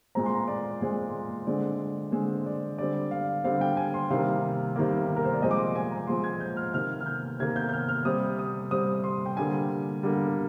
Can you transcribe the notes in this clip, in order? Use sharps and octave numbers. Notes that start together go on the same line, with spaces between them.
A#2 G#3 C4 A#5
C6
A#5
D5
A#2 G#3 C4
D3 G#3 C4 D5
D3 G#3 C4 C5
D5
D3 G3 C4 D5
F5
D3 G3 C4 F5
G5
G#5
C6
C3 D#3 G3 A#3 F5
C3 D#3 G3 A#3
A#4
C5
D5
A#2 F3 G#3 C4 D#5
D6
C6
G#5
A#5
A#2 F3 G#3 C4 C6
G#6
G6
F6
C3 D#3 A#3 F6
F6
G6
C3 D#3 A#3 G#6
G6
G6
F6
F6
C3 G3 C4 D#6
D#6
C3 G3 C4 D#6
C6
G5
D3 G3 A#3 G#5
D3 G3 A#3